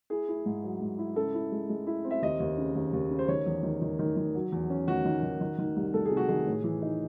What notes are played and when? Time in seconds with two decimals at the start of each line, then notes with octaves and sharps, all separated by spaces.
0.10 E4 G#4
0.28 E4
0.46 G#2
0.63 F#3
0.81 G#2
0.99 E4
1.16 C#3 A4
1.34 E4
1.52 G#3
1.69 G#3
1.87 E4
2.05 C4
2.11 E5
2.22 D#2 D#5
2.40 D#2
2.58 C#3
2.75 D#2
2.93 D#2
3.11 C#3
3.19 C5
3.28 D#3 C#5
3.46 E2
3.63 D#3
3.82 D#3
3.99 D#3
4.17 D#3
4.34 F#3
4.52 E2
4.70 C#4
4.88 D#3 F#4
5.05 D#3
5.23 D#3
5.41 D#3
5.58 D#3
5.76 C2
5.94 C2 A4
6.05 G#4
6.11 C3
6.17 F#4
6.28 D#3 G#4
6.46 A2
6.64 E3
6.82 D#4